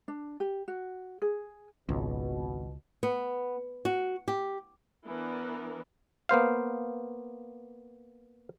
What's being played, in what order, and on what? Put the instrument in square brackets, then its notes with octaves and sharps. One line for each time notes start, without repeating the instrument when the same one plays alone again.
[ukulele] D4
G4
F#4
G#4
[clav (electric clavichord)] G#1 [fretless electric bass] C#2 [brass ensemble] B2
[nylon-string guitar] B3
F#4
G4
[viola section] E3 B3 D4 A#4
[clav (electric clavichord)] A#3 B3 C5 F5